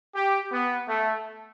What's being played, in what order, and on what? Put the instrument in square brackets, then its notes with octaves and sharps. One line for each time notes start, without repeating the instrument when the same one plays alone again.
[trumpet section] G4
B3
A3